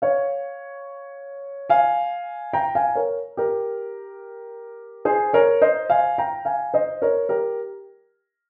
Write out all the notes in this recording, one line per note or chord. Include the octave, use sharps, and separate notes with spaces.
C#5 F5
F5 G#5
G5 A#5
F5 G#5
A#4 C#5
G4 A#4
G#4 C5
A#4 C#5
C5 D#5
F5 G#5
G5 A#5
F5 G#5
C5 D#5
A#4 C#5
G4 A#4